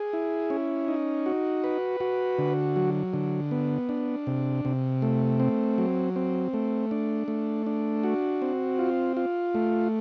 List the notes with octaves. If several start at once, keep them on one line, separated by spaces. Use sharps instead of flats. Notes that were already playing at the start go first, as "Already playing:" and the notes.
Already playing: G#4
E4
C#4
D#4
F#4
B4
F#4
D3
F#3
D3
B3
D4
C3
C3
A3
C4
F#3
C4
A3
D4
A3
D4
F#4
C4
F4
F4
A3